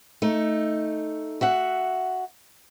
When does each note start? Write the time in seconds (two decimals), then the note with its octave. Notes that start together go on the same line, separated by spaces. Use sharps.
0.22 A3 D#4
1.41 F#4 E5 F#5